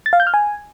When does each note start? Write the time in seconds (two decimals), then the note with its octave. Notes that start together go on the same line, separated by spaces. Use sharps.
0.06 A6
0.13 F5
0.20 G6
0.27 F6
0.34 G#5